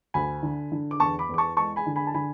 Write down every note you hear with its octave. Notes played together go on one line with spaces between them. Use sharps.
D2 G#5 B5
D3
D3
D6
E2 A5 C#6
B5 D6
E2 D6
A5 C#6
G#3 A5 C#6
G#5 B5
D3
G#5 B5
A5
D3 G#5 B5